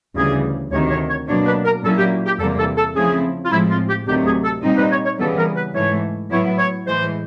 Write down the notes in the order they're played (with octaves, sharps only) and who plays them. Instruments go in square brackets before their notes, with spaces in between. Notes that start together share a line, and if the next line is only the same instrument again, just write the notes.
[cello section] D2 C#3 E3 G3 [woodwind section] G#4
[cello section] D2 C3 D#3 [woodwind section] C#5
[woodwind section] C#5
C#5
[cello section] B2 F#3 A#3 D4 [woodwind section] C#5
[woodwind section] B4
A#4
[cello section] A#2 F#3 A#3 C#4 E4 [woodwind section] A4
[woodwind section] G4
G4
[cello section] E2 C3 E3 G3 A#3 [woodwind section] A4
[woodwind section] A4
A4
[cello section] C#3 F3 A3 C4 E4 [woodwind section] G#4
[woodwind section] F4
[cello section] A2 F3 G#3 C4 [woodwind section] E4
[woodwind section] F4
G4
[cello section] D2 C3 D#3 F#3 A3 [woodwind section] G4
[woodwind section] G#4
A4
[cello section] A#2 G3 C4 D#4
[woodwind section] B4
C#5
C#5
[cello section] C#3 E3 G3 B3 [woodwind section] A4
[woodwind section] A#4
B4
[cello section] G#2 E3 A3 [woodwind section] C#5
[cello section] A2 F#3 B3 E4 [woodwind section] C#5
[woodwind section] C#5
[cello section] A2 E3 G#3 [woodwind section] C5